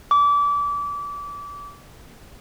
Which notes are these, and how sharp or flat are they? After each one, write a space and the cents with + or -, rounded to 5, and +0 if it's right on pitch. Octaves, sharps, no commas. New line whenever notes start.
D6 -30